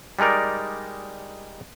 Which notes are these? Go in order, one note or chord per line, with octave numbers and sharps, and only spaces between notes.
G3 G#3 D#4 A#4 D5